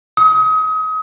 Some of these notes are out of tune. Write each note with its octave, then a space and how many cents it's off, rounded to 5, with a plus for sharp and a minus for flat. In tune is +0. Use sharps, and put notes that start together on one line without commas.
D#6 +30